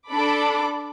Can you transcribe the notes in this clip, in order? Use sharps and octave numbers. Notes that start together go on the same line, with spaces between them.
D4 A4 B5 D6